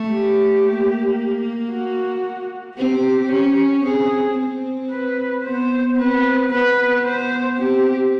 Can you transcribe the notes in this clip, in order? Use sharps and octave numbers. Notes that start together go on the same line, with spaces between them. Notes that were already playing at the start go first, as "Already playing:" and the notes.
Already playing: A3
G4
A#3
F#4
C4 G4
C#4
C4 G#4
C4
B4
B3 C5
C4 B4
B3 B4
C5
C4 G4